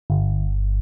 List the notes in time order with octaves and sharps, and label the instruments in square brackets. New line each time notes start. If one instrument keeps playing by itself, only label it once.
[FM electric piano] G1